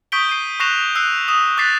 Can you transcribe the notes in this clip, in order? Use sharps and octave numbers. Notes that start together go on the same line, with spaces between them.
C#6 D#6 G6 B6 D7 G7
C7 D#7
C#6 F#6 A#6 C7 E7 F7
E6 F#6 C7
D#6 E7
D6 F#6 A6 B6 C7